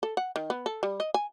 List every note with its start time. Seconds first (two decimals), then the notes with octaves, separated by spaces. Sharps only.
0.03 A4
0.17 F#5
0.36 D#3
0.50 B3
0.66 A4
0.83 G3
1.00 D#5
1.14 G#5